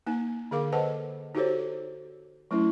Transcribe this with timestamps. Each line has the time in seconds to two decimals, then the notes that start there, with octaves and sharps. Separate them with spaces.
0.07 A#3 D#4 G#5
0.51 D3 G#4 A#4 F5 D6
0.72 A4 B4 C5 D#5 F#5 A5
1.35 D#4 F#4 G4 A4 C5 C#5
2.51 F#3 A3 C#4 E4